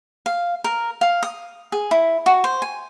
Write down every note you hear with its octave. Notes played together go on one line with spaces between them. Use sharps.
F5
A#4
F5
D#6
G#4
E4
F#4
C5
G#5